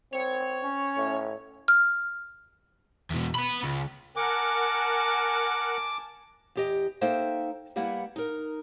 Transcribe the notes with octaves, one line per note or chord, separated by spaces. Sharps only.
C4 C#5
C#4
A2
F6
E2 B2
B3 B5
C#2
A#4 F#5 G#5 A5 D6
E2 G4 D#5
A#3 D#4 A4 C5 E5 G5
G3 A#3 B3 E4 F#5
D#4 A#4